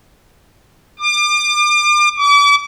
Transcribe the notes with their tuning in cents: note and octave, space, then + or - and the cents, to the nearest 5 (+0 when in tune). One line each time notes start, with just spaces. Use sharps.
D6 +35
D6 -40